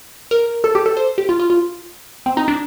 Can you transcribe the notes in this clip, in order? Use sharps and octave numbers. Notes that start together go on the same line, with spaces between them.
A#4
A4
G4
A4
C5
G4
F4
F4
F4
C4
D#4
D4